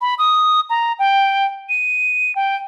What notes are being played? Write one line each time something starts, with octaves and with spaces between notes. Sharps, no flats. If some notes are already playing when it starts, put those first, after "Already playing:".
B5
D#6
A#5
G5
D#7
G5